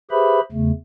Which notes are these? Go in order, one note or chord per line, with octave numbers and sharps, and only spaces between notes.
G4 G#4 B4 C5 E5 B5
E2 C#3 A3